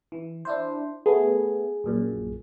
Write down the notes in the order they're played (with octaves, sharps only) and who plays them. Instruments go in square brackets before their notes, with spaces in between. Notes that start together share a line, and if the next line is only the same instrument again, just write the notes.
[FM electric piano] E3
D4 E4 C5
[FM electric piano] A3 B3 [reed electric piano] G#4
[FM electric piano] A#1 F#2 A#2